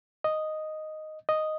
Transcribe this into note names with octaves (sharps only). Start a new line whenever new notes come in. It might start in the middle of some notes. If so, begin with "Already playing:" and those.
D#5
D#5